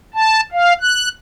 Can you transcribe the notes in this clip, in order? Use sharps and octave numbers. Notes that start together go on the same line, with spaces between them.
A5
F5
F#6